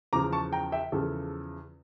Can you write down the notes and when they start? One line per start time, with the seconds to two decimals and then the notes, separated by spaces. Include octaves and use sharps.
0.13 E2 C#3 F3 A#5 D6
0.32 A5 C#6
0.53 G5 A#5
0.72 E5 G5
0.92 E2 C#3 F3 A4